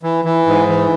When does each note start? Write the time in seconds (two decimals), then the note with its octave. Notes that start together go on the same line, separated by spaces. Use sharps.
0.03 E3
0.25 E3
0.46 G#2
0.68 E3